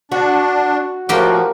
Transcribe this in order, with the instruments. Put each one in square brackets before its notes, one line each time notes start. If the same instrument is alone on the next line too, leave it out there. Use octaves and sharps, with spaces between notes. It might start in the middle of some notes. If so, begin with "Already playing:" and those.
[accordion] D4 [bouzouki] F#4
[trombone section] A#1 A2 F#4 [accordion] F3 [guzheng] A#3 G4 G5